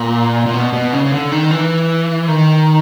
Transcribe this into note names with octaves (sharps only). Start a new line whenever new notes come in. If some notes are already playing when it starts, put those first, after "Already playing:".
Already playing: A#2
A#2
B2
B2
C#3
C#3
D3
D#3
E3
D#3